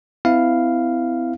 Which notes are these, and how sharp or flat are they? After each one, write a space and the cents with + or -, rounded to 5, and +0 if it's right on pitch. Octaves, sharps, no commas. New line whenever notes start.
C4 -40 E4 +0 F5 -5